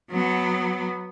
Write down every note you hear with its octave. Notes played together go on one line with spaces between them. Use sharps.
F#3 B3